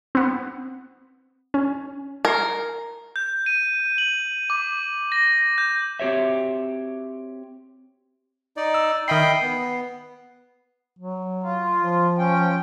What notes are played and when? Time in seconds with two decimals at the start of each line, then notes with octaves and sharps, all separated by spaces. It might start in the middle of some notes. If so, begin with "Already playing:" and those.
0.15 B3 C4
1.54 C#4
2.25 A#4 G#6 C7
3.16 G6
3.46 D#7
3.98 F#7
4.50 D6
5.12 A#6
5.58 G6
5.99 C4 F#4 G4 C#5 E5
8.57 D#4 D5
8.74 E6
9.08 D#3 D#5 E5 G5 B5 C7
9.23 C7
9.42 B3
10.99 F#3
11.43 F4
11.80 F3
12.18 C#4 G5